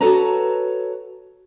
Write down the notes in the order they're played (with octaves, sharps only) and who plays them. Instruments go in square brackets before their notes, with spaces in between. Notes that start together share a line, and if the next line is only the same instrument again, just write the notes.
[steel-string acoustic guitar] F#4 A4 B4 C#5 A5 A#5